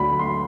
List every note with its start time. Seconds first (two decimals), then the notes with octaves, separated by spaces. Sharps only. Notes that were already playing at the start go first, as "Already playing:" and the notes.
Already playing: D2 D3 F#3 B5
0.19 C6